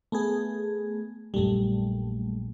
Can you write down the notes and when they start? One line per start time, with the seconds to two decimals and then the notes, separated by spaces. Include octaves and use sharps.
0.12 A3 B3 G#4
1.34 A#1 F#2 G3 A3